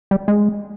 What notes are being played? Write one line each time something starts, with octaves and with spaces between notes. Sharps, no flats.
G3
G#3